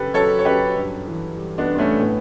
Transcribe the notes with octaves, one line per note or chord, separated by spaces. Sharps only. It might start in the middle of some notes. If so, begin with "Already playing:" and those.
Already playing: F#2 C#3 G4 A4 B4
F#3 A4 C#5
C#5
F#2 G4 B4
G2
E3
G3
B3 D4
G2
B3
A3 C#4
A2 B3